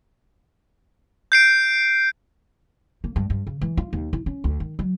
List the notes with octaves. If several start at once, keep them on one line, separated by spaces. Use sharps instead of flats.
G6 C7 D7
A#3
G2
G2
C#3
E3
F4
D#2
E4
C#4
D2
D#3
F#3